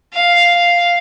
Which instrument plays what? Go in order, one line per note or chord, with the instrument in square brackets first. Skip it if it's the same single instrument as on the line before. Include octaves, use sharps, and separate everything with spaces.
[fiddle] F5